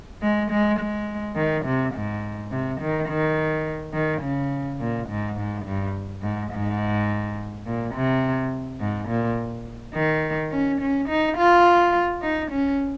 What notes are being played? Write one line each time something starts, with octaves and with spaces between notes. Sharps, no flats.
G#3
G#3
G#3
D#3
C3
G#2
C3
D#3
D#3
D#3
C#3
A#2
G#2
G#2
G2
G#2
G#2
A#2
C3
G#2
A#2
D#3
C#4
C#4
D#4
F4
D#4
C#4